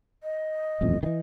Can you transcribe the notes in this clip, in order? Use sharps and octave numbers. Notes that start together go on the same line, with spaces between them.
D#5
D#1 A1 F2
D#3 E3 D#5